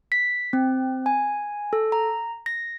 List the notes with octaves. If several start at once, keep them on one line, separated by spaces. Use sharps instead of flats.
B6
C4
G#5
A4
A#5
A#6